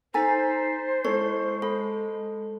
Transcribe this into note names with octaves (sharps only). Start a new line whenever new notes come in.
D#4 A4 C5 G#5 A#5 A6 B6
G#3 E4 A4 C#5 C#6
A4 B5